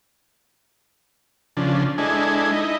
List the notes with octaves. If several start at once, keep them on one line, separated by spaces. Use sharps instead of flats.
C#3 F3 D4
G#3 D4 E4 A4 D#5 G#5
D#4 E4 D#5